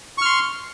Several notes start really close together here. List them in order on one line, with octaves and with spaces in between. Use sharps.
C#6 F6 C6